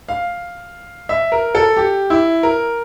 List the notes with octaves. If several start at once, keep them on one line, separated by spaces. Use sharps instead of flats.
F5
E5
A#4
A4
G4
E4
A#4